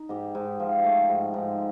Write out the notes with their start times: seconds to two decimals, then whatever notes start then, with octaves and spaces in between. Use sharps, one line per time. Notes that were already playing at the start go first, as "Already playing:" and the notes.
Already playing: D#4
0.09 G#2 G4
0.35 G#2
0.60 F3
0.84 A3
1.09 G#2
1.34 G#2